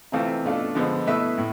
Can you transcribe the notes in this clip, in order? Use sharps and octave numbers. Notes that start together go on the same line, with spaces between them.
C3 E3 A3 C4 F4
B2 A3 D4 F4 A4
D3 F3 G#3 B3
B2 A3 E4 B4 E5
A2